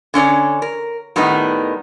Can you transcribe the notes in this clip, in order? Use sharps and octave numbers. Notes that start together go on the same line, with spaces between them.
D3 C#4 C#5 D5
A#4
A2 D#3 G3 B3 D#4